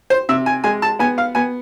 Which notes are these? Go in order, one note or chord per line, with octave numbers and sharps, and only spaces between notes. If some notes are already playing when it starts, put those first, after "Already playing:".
C5
C3 E5
G#5
G#3 G#5
A5
B3 G#5
F5
B3 G#5